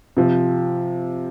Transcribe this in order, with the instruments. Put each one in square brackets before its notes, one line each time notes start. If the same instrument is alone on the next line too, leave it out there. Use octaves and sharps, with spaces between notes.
[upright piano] C3 F3 C4